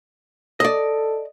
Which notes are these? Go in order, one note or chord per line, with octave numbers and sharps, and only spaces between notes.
A4 D5 D#5